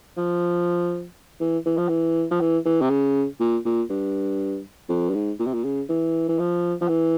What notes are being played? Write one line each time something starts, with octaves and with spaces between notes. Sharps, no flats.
F3
E3
E3
F3
E3
F3
E3
E3
C3
C#3
A#2
A#2
G2
F2
G2
G#2
A#2
C3
A#2
C#3
E3
E3
F3
F3
E3